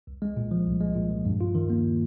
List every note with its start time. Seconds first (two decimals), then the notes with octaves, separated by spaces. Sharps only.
0.07 C2
0.22 G#3
0.36 A#2
0.51 F3
0.66 C2
0.81 G#3
0.95 A#2
1.10 F3
1.25 G2
1.41 F4
1.55 D#3
1.70 A#3